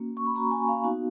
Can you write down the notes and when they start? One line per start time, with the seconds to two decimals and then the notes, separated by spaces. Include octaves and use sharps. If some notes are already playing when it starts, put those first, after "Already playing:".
Already playing: A#3 C#4 F#4
0.17 C#6
0.26 B5
0.35 A#3 C#4 F#4 A#5
0.51 G#5
0.69 F5
0.84 B3 D#4 F#4